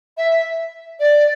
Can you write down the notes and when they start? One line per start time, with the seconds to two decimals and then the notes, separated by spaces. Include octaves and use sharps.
0.17 E5
0.99 D5